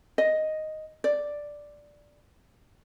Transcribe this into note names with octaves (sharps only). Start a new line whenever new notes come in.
D#5
D5